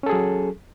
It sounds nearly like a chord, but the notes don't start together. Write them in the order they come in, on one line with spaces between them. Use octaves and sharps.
C#4 A4 G#4 F#3